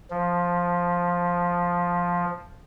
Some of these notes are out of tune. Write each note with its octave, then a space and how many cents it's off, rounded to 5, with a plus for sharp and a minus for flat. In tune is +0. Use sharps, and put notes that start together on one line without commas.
F3 +5